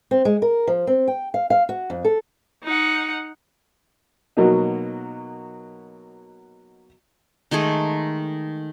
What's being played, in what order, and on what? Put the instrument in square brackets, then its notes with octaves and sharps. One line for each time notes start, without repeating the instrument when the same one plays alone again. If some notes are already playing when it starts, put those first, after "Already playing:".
[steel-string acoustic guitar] C4
G#3
A#4
F3
C4
G5
F5
F5
F#4
F2
A4
[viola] D#4 F#5
[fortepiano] B2 F#3 A#3 D#4
[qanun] D#3 G#3 A3 G#4